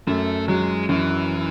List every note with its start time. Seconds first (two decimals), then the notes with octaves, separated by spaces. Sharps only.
0.07 F#2 A3
0.48 F#3 G#3
0.89 F#2 E3